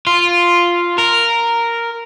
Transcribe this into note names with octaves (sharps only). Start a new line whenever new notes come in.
F4
A#4